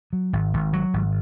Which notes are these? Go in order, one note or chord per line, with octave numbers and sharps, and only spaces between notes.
F#3
G#1
G#1
F#3
G#1